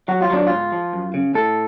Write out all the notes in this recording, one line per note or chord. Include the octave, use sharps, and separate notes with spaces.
F#3 F#4
F4
F#3 D4
G#2 F4
F3
F#2
C#3
A2 A4